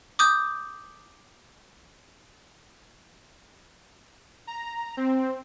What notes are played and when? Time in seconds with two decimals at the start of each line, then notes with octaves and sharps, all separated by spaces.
0.19 D6 D#6 G6
4.47 A#5
4.97 C4